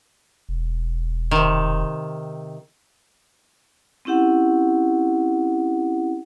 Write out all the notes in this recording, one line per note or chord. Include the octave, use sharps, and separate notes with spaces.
E1
C3 D#3
C4 C#4 E4 G4 F#5